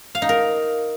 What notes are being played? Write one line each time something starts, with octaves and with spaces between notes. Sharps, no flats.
F5
D#4
A#4